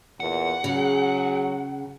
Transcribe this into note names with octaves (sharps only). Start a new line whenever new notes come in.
E2 A#2 F#5
C#3 F#3 G#4